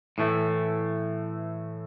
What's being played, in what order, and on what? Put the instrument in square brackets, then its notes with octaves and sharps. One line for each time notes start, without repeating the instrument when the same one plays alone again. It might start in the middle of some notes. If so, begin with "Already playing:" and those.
[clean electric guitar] A2 E3 A3